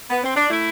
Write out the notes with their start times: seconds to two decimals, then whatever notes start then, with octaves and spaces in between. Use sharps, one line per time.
0.10 B3
0.24 C4
0.36 D4
0.50 A3 E4